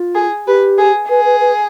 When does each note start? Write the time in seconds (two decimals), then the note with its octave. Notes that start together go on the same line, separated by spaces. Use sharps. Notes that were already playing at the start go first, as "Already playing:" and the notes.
Already playing: F4
0.15 G#4
0.47 G4 B4
0.78 G#4
1.09 G#4 B4
1.25 B4
1.40 B4